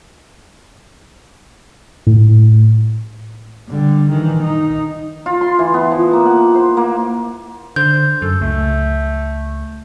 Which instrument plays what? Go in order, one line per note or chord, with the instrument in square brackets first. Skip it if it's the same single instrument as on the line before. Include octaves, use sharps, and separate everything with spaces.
[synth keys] A2
[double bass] D3 G3
D#3 E3
D#4
[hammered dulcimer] F4
C6
E3
B3
F3
A#3
F#5
C5
A#3
[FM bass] D3 [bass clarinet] C5 [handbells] G6
[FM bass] F#2 [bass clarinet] A4
[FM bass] C#2 [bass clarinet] A3